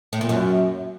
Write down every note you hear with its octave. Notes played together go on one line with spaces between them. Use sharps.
A2
A#2
F#2